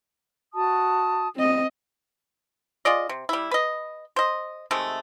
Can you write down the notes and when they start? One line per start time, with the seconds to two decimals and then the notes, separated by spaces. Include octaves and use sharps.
0.54 F#4 A5 D#6
1.36 C4 D#5
2.85 F4 G#4 D5 D#5
3.09 C3
3.29 G3 E4
3.51 B4 D#5
4.16 C5 D#5
4.71 C3 D#3 G#3 A3